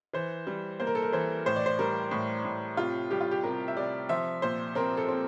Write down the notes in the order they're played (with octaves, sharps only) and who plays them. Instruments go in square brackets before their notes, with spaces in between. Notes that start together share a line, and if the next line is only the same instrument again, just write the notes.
[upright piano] E3 C5
G3
A#3 C5
A#4
A4
A#4
E3 C5
A2 C5
D5
C5
G3 A#4
A2
A2
C3 F4
G3 G4
F4
G4
C3 A#4
E5
C3 D5
F3 E5
A#2 C5
C4 A#4
A4
C4